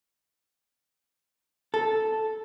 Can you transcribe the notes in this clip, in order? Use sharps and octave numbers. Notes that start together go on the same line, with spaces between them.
A4